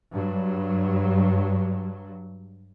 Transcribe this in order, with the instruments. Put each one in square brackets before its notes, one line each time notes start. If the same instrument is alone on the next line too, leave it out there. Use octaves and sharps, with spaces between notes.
[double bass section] G2 F#3